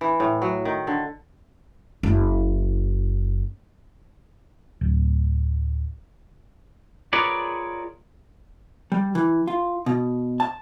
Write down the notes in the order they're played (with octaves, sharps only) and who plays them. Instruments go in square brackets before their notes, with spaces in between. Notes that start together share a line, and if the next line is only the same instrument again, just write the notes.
[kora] E3
A2
F#3
D#3
D3
[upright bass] F#1 E4
[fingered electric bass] D1
[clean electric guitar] F4 G#4 A#4 B4 C#5 D5
[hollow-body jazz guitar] G3
E3
F4
B2
A5